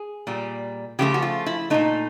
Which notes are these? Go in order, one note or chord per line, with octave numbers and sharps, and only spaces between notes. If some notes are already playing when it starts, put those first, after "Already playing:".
Already playing: G#4
A#2 G3
C#3 F3 A3 G4
F#4
F4
E4
A#2 F3 A3 D#4